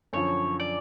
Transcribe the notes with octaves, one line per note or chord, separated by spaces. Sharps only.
F#2 D3 F3 C#5
D5